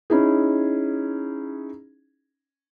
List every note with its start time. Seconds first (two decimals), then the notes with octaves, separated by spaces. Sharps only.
0.10 C#4 D#4 E4 G#4